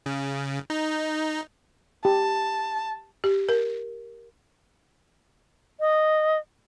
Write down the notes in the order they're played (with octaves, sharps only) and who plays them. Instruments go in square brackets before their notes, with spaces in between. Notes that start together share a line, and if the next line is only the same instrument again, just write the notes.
[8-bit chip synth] C#3
D#4
[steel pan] G4 [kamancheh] A5
[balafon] G4
A#4
[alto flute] D#5